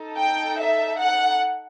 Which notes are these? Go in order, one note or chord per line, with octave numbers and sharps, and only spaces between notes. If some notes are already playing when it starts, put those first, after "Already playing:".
Already playing: D#4 A4
G5
E5
F#5